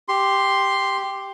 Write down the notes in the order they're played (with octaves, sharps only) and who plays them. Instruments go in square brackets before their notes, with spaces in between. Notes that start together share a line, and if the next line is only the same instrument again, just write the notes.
[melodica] G4 [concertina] C6